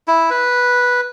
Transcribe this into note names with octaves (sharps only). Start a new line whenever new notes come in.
E4
B4